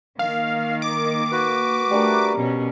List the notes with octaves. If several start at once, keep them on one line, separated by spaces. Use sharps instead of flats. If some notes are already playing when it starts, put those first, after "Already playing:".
D#3 A#3 F5
D6
F#4 B4
G3 A3 D4 A#4
B2 C#4